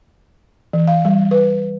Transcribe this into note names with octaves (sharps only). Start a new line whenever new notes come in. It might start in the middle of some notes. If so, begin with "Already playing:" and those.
E3
F5
G3
B4